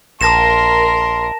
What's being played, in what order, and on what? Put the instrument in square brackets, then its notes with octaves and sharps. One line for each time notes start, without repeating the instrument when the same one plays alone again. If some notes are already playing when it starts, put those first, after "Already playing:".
[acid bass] A#1 [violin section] A#4 [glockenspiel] A5 A#6 E7 [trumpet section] C6